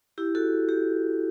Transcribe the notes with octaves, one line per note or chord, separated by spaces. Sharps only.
E4 G4
F#4 A4
G4